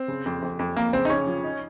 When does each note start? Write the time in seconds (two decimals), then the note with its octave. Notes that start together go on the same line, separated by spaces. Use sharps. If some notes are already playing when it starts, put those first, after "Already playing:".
Already playing: C4
0.08 C#3
0.26 F2
0.42 F2
0.59 F2
0.76 F2 A#3
0.93 C#3 C4
1.05 D#4
1.10 C#3 C#4
1.27 F3
1.44 D#4